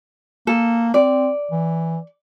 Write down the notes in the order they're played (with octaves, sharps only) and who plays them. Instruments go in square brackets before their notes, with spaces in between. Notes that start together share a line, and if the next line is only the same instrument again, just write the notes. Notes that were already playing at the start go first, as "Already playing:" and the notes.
[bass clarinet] A#3 [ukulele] A4
[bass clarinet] C4 [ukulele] D5
[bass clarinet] E3